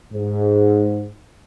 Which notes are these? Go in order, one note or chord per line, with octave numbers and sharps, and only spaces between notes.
G#2